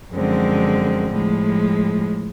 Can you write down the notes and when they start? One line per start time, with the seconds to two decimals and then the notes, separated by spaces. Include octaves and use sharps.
0.11 F#2 D3 F3 G#3 C4
1.10 A2 F3 G#3